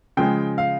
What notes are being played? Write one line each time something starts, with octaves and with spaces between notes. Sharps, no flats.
C#3 F3 G#3 G5
F5